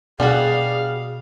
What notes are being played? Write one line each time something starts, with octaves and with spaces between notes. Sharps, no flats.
B2 G3 D4 F#4 G#4 F5